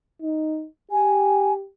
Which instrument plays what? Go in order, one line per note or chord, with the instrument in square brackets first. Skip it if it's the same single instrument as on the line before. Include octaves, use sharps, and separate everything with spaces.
[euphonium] D#4
[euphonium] G4 [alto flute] G#5